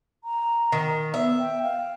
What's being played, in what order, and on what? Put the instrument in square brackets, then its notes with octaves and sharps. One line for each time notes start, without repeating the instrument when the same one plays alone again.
[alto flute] A#5
[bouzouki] D#3
[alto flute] B3 [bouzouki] E5
[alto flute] G5
F5